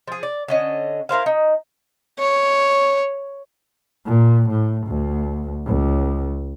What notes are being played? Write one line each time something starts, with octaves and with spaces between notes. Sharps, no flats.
F3 G#4
D5
D3 C#4 D#5
E4 A#4 C5 F5
D#4
C#5
A#2
A2
D2
C#2